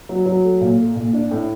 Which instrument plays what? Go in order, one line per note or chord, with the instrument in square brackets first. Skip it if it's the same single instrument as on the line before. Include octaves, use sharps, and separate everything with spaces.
[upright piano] F#3
F#3
A3
A#2
A3
A#2
D4
A2